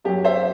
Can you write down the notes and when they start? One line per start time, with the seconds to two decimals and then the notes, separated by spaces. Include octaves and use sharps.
0.05 F#2 G4
0.09 F#3
0.24 C5 E5